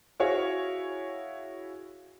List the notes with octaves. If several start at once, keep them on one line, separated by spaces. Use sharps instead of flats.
E4 F#4 G#4 C#5 F5